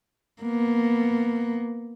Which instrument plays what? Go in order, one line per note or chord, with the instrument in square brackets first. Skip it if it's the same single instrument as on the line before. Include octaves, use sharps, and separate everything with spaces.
[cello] A#3 B3